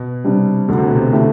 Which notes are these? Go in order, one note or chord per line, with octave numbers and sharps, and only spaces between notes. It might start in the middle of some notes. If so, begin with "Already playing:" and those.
Already playing: B2
C3 G3 D4
D2 D3
C3
B2
C3
D3 A3 E4 G4